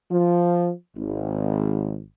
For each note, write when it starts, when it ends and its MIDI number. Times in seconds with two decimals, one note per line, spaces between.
0.10 0.71 53
0.96 1.98 32